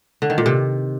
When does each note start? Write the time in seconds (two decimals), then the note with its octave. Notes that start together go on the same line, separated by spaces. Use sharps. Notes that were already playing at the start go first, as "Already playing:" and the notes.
0.22 D3
0.30 D#3
0.38 A#2
0.46 C3